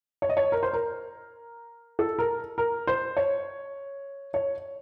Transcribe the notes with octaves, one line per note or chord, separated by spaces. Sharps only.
C#5
D#5
C#5
A#4
C5
A#4
A4
A#4
A#4
C5
C#5
C#5